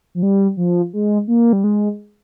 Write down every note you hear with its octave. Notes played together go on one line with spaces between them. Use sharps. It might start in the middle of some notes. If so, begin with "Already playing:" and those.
F3
G3
F3
G#3
A#3
G3
G#3